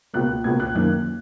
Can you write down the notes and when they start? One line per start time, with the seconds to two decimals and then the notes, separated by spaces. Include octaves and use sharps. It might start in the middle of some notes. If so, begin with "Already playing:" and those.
0.14 C#2 B2 A#3 F#6
0.44 C#2 B2 A#3 G#6
0.60 F#6
0.75 F#2 D#3 A#3 F#6